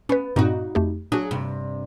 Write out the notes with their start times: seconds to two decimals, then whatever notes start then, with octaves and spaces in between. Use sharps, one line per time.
0.09 B3 C#4 B4
0.36 G2 A#2 C4 D#4 F#4
0.75 F2 A3 G4
1.12 F#3 D4 F#4 G#4
1.31 G2 C3